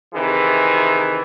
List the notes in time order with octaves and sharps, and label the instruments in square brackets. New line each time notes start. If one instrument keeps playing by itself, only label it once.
[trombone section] C3 D#3 E3 G#4 B4